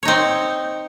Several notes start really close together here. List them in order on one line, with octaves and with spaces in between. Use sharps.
C#5 D#4 C4